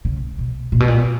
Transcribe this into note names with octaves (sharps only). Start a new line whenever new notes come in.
C#3
B2
A#2
B2
A#2